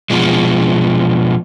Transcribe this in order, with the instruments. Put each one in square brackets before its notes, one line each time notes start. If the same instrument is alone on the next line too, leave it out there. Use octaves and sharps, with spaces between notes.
[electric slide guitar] B2 F3 G#3